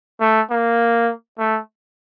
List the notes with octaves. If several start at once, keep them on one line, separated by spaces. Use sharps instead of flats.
A3
A#3
A3